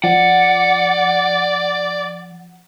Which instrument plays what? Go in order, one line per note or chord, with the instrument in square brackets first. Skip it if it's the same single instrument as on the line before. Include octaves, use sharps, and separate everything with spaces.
[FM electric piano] F3 [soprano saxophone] D5 [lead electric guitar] F#5